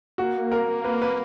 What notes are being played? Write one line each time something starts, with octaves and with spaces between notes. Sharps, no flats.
A#3 F#4
A#4
B4
B4